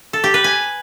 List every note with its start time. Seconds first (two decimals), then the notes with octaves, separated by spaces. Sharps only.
0.13 A4
0.24 G4
0.34 B4
0.44 G#5